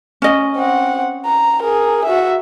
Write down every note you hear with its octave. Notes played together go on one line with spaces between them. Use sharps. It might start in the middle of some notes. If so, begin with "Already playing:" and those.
C#4 D#5
C4 F#5
A#5
G#4 A#4
F#4 E5